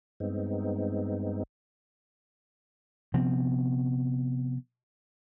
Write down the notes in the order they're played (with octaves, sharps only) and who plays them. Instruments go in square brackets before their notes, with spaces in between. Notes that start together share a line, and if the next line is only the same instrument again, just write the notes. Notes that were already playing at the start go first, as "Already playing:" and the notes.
[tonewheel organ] G2 G#3 B3 C4 D#4
[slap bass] C3 F3 B3 C4